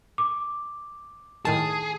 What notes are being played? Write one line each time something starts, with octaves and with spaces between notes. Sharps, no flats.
D6
A2 D#3 G#4 A5